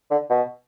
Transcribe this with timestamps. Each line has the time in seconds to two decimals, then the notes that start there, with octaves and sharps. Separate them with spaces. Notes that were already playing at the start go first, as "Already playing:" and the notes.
0.11 D3
0.30 B2